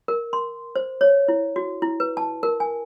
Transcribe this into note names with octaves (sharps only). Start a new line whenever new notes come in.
A#4
C6
C5
C#5
E4
F#4
E4
B4
A5
A#4
G#5